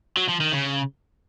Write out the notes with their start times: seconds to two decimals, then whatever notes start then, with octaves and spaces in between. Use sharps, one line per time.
0.17 F#3
0.29 F3
0.41 D#3
0.53 C#3